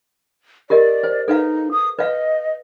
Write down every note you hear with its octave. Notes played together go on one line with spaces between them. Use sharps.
G4 A#4 D5 D#5
C5
D#4 A4 B4 F5
D#6
B4 D#5 F5